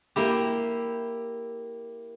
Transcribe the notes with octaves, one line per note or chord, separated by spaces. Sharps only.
A#3 E4 G4